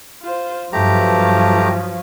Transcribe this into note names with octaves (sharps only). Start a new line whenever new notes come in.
F4 C5
G2 F3 F#3 A3 G4 A#5